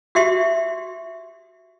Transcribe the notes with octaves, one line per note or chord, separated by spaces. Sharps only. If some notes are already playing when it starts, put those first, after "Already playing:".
F#4 G4 E5 C6